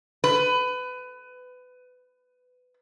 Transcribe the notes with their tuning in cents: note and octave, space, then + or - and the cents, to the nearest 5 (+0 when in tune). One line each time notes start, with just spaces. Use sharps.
B4 +25